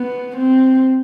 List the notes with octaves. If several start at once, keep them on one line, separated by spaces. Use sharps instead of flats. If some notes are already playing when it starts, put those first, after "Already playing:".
Already playing: B3
C4